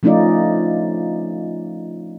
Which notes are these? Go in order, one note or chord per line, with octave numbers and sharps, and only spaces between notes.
F3 A3 C#4 D#4 F4 D5